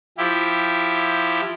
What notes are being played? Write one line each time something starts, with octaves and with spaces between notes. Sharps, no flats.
F3 E4 G4